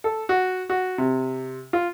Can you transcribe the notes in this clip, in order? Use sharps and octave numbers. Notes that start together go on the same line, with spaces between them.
A4
F#4
F#4
C3
F4